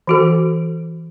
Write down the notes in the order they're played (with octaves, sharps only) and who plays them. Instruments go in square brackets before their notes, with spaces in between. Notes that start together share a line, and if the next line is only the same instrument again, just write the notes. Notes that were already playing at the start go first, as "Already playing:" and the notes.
[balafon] E3 F#4 A4